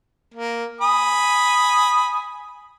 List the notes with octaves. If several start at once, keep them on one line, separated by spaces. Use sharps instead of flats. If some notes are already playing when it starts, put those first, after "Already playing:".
A#3
G#5 B5 D#6